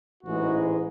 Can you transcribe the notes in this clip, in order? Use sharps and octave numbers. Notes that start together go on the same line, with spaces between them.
A1 G#2 E3 G#3 F#4